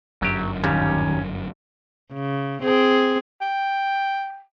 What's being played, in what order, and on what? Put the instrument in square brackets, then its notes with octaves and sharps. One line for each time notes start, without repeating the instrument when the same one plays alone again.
[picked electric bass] G1 F#2 [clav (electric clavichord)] F#3 G4
[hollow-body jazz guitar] D#2 [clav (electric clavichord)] A#2 G3 [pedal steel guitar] C#4
[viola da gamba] C#3
C4 G#4
[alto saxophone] G5